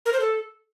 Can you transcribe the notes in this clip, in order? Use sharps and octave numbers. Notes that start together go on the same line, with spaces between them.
A#4
C5
A4